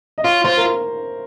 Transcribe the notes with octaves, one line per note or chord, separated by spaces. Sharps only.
D#5
F4 C#5
F4 C5
A#4